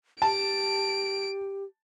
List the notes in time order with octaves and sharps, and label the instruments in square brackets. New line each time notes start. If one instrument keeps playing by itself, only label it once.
[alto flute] G4 [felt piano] A5 [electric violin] D7